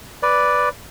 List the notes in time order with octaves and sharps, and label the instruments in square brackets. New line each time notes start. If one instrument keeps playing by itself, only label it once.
[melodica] B4 D5